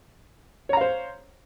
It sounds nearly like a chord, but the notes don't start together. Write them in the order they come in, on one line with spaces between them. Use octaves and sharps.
C#5 A#5 F5 C5